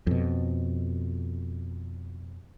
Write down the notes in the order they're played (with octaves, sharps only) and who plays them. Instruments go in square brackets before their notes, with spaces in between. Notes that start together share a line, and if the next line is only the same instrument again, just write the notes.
[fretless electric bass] F2 B2